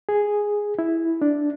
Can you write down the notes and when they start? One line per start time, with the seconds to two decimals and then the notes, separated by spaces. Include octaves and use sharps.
0.09 G#4
0.79 E4
1.22 D4